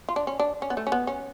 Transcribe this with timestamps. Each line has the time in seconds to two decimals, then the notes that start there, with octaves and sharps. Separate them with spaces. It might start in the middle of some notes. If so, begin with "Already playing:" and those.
0.09 F4
0.16 D4
0.27 C#4
0.40 D4
0.62 C#4
0.70 B3
0.77 A3
0.87 C#4
0.92 B3
1.07 C#4